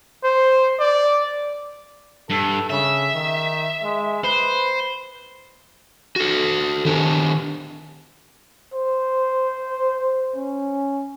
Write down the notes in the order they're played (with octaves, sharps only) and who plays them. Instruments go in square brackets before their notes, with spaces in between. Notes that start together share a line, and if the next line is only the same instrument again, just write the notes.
[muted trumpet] C5
D5
[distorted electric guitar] G2 [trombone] A4
[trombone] C#3 [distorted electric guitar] E5
[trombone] D#3
G#3
[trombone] B4 [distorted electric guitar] C5
[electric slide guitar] F#4 A4
D#3 D4 G4
[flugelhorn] C5
C#4